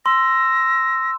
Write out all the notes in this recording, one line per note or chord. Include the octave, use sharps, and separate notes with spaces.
C6 E6 A#6